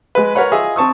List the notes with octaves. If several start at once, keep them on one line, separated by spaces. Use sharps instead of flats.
G#3 B4
A#4 B4 C#5 F#5 B5
F4 G#4 D#5 E5
C4 A5 C#6 D#6